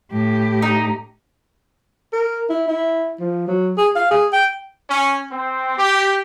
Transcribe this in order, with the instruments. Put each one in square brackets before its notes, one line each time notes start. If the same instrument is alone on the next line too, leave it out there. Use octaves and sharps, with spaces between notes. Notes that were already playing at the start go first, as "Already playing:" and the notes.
[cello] A2 G4
[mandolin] D#4
[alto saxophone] A#4
E4
E4
F3
F#3
G#4
F5
G#4
G5
[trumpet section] C#4
C4
G4